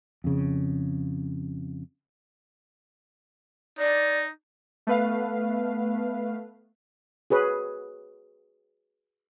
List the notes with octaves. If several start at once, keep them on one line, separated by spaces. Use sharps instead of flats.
F2 C#3
D#4 D5
A3 B3 B4 F5
F#4 G#4 B4 C#5